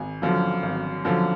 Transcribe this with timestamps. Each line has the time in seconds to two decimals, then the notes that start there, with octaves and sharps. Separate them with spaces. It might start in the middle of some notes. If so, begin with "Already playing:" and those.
Already playing: G#1 G#5
0.22 F#2 D3 F3
0.63 G#1
1.05 F#2 D3 F3